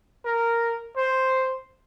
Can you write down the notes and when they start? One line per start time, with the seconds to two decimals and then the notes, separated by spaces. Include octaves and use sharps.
0.25 A#4
0.96 C5